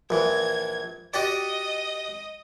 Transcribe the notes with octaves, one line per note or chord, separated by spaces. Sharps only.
A#1 E3 G#6
F#4 G4 D5 D#5